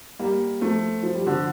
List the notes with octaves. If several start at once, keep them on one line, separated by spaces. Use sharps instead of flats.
G3 A#3
F3 A3
F3
G3
D3 F3